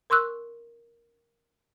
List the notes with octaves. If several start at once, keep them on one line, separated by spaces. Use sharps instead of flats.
A#4 C6 C#6 E6 F#6